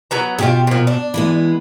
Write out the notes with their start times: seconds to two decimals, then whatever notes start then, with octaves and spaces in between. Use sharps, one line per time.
0.11 F#3 B3 A#5
0.39 B2 F4 G4 G#4
0.67 A#2 F3
0.87 D4
1.14 E3 G#3 B3